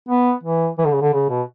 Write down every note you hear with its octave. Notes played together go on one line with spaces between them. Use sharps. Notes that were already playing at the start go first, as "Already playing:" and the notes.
B3
E3
E3
D3
C#3
D3
C#3
B2